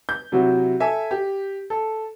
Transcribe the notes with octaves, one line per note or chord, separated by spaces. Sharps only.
G6
C3 F#3 E4 F#4
A4 E5 G#5
G4
A4